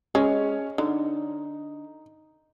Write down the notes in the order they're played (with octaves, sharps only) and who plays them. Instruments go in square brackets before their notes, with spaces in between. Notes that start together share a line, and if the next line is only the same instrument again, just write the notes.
[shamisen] G#3 [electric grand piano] C#4 C#5
[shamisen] D3 [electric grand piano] D#4